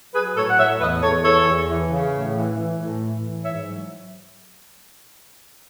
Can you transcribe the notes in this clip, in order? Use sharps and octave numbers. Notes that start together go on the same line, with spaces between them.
F#3 G#4 B4
A2 A4 C#5
F#5
A2 C#5 E5
E2 B4 D#5
E2 A4 C#5
E3 A4 C#5
E2
E3
C#3
A2
E3
E3
A2
E3
E3
G#2 C#5 E5
F#3